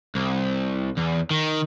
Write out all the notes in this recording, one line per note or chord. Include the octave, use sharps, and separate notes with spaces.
C2
E2
D#3